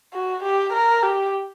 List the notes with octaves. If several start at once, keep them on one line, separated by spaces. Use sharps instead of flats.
F#4
G4
A#4
G4